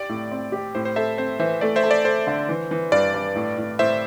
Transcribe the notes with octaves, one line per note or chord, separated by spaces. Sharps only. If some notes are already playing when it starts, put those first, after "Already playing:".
Already playing: G4 D5
A2
C4
G4
A2 C5
C5
A4 C5 E5
C4 C5
E3 C5 E5
A3 D5
C5 E5
A4
D5
A4 C5
D3
E3
E3
G2 D5
G2
A2
A2
A2 C5 E5